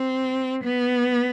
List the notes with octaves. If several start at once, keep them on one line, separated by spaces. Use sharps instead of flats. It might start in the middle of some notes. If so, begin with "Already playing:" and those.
Already playing: C4
B3